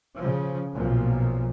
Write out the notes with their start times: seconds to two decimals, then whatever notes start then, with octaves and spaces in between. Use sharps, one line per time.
0.18 C#3 F3
0.75 B1 A#2 F3